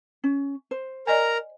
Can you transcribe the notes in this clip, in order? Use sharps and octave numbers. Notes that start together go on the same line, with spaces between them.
C#4
C5
A#4 D5 D#5 G#5 A#5